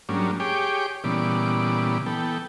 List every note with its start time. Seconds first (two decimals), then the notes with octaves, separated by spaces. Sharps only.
0.09 G#2 F#3 G3 A#3 C#4 D4
0.40 G4 G#4 C#5 G5 D6
1.04 A#2 C#3 E3 G3 B3 D5
2.06 E3 B3 A4 G5